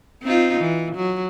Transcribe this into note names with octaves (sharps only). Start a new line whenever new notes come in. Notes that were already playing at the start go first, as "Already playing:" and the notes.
C4 D#4 F4
E3
F#3